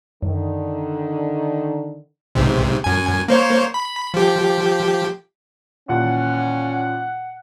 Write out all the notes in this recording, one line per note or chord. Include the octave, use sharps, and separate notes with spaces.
F#2 D3 D#3
B1 G#2 C3
F#2 G#5
A#3 C5 C#5
B5
F3 G4
D#2 A#2 E3 C#4 F#5